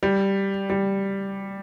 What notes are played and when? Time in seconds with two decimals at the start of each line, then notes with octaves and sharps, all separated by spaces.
0.03 G3
0.70 G3